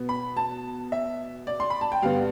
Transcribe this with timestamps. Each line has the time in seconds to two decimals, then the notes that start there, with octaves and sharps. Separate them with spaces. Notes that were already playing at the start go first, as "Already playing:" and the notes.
Already playing: B2 B3
0.09 B5
0.37 A5
0.92 E5
1.47 D5
1.60 C6
1.70 B5
1.81 A5
1.92 G5
2.02 G2 D3 G3 B3 F5